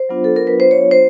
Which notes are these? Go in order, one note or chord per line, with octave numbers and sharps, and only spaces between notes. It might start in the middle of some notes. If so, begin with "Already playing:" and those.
Already playing: C5
F#3 B3 D4 F4
A4
A#4
B4
C5
C#5
C5